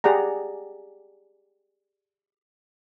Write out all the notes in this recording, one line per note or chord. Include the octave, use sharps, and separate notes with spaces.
G4 G#4 D5 F#5 A#5